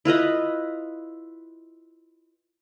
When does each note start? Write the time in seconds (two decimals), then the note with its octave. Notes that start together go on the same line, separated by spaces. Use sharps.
0.05 E4 F4 B4 D#5